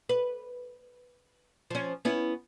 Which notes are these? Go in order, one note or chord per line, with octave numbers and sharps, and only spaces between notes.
B4
F3 C#4
B3 C#4 E4